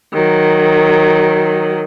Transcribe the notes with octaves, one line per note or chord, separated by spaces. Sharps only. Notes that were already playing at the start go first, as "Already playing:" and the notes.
D#3 F#3